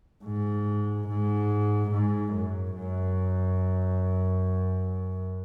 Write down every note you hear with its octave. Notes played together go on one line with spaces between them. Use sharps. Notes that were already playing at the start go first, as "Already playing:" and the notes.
G#2
G#2
G#2
F#2
F#2